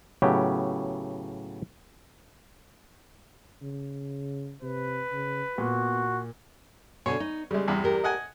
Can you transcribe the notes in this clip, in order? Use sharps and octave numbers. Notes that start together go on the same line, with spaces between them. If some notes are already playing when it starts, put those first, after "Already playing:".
A2 C#3 F#3 B3 G4
C#3
C3 B4
C#3
A#2 B3 F#4
B2 D3 C#5 G#5
D#4
C#3 G3 G#3
E2 G2 C3
G4 A#4
D#5 F#5 G#5